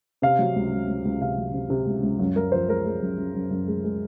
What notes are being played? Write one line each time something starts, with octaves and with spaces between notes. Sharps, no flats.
C3 F5
F#3
C#2
C#2
C#2
C#2
C3 F5
F#3
C3
C3
C#2
C#2
F#2
F#2 A#4
F3 C5
G#3 A#4
G#3
F#2
F#2
F#2
F#2
G#3
G#3